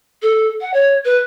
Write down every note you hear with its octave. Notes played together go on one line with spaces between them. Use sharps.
A4
F#5
C#5
B4